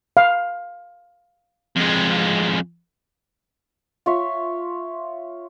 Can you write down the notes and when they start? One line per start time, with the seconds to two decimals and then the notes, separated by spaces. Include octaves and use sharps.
0.17 F5
1.76 F2 G#3
4.06 F4 C#5 E5